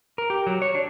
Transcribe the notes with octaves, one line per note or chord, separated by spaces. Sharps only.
A#4
G4
F#3
C#5
D4